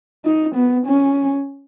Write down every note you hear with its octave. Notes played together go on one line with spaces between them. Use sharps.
D#4
B3
C#4